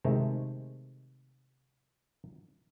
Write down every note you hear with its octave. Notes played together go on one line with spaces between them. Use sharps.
C3 D#3 G#3 A3